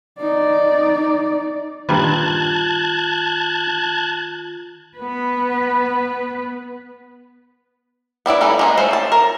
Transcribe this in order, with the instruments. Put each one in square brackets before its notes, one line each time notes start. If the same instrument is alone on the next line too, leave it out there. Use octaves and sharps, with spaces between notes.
[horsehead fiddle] D#4 D5
[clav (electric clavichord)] G2 A#2 B4 [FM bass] D#3 [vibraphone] F4 [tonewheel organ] A5 F#6 G#6
[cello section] B3 B4
[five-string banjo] B3 D4 E4 D5
G3 C#4 D#4 A4
G#3 A#3 B3
A3 C#4 A4 C5
C#5 A5
A#4